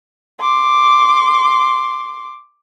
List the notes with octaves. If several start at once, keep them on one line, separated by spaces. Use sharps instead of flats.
C6 D6